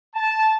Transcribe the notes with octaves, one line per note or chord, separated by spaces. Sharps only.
A5